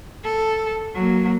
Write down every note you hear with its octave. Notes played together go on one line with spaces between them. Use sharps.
A4
F#3 A#3